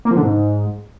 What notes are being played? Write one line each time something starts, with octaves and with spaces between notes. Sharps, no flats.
A#3
F3
D3
G#2